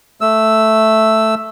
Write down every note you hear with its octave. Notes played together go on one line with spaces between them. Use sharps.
A3 E6